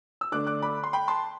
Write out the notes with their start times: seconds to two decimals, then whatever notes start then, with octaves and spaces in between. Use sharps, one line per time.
0.21 E6
0.32 D3 A3 D4 D6 F#6
0.46 D6 F#6
0.62 B5 D6
0.84 C6
0.93 G5 B5
1.08 A5 C6